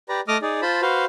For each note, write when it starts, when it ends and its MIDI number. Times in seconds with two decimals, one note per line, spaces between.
0.09 0.21 67
0.09 0.21 71
0.09 0.21 74
0.09 0.21 82
0.28 0.38 57
0.28 0.38 75
0.28 0.38 86
0.28 0.38 87
0.28 0.38 89
0.42 0.61 63
0.42 0.61 68
0.42 0.61 74
0.62 0.81 65
0.62 0.81 72
0.62 0.81 81
0.62 0.81 83
0.82 1.05 66
0.82 1.05 71
0.82 1.05 72
0.82 1.05 77